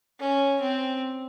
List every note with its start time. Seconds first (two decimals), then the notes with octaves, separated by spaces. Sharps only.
0.20 C#4
0.61 C4